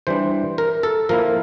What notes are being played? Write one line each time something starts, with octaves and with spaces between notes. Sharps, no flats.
E3 G3 D4 C5
A#4
A4
F3 A#3 E4 A#4